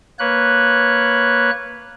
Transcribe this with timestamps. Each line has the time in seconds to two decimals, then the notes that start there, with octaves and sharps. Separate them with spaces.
0.19 A#3 B4 C#5 F#6